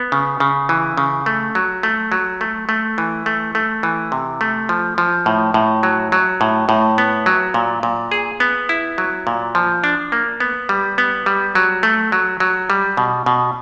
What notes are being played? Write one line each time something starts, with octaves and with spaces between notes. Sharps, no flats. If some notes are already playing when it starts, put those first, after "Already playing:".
Already playing: B3
C#3
C#3
E3
C#3
A3
F#3
A3
F#3
A3
A3
E3
A3
A3
E3
C3
A3
F3
F3
A2
A2
F#3
F#3
A2
A2
B3
F#3
A#2
A#2
G#4
B3
E4
F#3
A#2
F3
D4
A#3
B3
G3
B3
G3
F#3
A3
F#3
F#3
G3
B2
B2